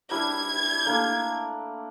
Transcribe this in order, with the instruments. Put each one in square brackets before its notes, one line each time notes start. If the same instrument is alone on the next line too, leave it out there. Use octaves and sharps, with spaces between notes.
[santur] G3 D4 E4 [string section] G#6
[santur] A3 A#3 D4